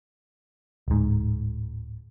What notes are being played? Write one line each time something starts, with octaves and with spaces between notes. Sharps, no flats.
D1 G#2